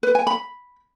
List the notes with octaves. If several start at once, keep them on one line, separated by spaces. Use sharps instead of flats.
B4
G#5
B5